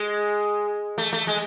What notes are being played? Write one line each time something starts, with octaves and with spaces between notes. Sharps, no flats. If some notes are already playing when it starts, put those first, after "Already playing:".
Already playing: G#3
A3
A3
G#3